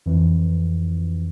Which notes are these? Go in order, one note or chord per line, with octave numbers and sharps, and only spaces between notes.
F2 E3